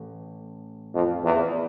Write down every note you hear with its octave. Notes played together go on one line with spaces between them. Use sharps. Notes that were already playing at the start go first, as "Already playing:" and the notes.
Already playing: A1
F2
E2